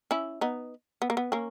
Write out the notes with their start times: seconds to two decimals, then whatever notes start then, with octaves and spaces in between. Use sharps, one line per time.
0.11 C#4 E4
0.41 B3 D#4
1.02 B3
1.10 A#3
1.17 B3
1.32 A#3 C#4